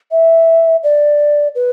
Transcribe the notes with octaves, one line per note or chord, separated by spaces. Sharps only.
E5
D5
B4